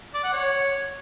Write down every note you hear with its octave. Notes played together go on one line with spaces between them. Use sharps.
D5
F#5
C#5